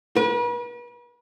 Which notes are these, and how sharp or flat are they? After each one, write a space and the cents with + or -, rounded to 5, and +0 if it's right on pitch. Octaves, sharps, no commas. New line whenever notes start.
B4 -40